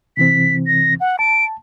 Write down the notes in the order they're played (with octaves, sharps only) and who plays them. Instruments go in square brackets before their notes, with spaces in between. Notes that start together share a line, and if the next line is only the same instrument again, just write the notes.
[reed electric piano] C3 E3 C4 [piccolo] B6
[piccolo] A#6
F#5
[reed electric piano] A5 [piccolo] D7